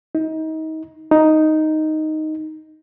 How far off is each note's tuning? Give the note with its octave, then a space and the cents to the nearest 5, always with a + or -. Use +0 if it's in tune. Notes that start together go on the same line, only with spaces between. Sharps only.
D#4 +30
D#4 +0